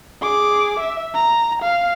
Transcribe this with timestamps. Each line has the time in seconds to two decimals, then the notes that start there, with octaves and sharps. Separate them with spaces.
0.22 G#4 D6
0.80 E5
1.14 A#5
1.62 F5